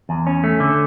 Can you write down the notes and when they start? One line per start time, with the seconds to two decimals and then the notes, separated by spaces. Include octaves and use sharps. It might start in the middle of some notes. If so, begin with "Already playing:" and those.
0.09 E2
0.27 C#4
0.44 A3
0.60 D3